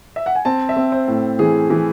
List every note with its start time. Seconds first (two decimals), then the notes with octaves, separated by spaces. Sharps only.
0.16 E5
0.26 F#5
0.35 G#5
0.45 C4 A5
0.69 E5
0.77 C4
0.92 C5
1.08 A2
1.39 E3 G#4
1.70 E3